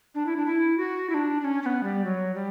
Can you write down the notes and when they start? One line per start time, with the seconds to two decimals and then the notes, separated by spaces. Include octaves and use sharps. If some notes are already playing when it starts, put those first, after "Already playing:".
0.15 D4
0.26 E4
0.36 D4
0.46 E4
0.78 F#4
1.10 E4
1.14 D4
1.41 D4
1.45 C#4
1.62 C#4
1.66 B3
1.83 G3
2.04 F#3
2.35 G3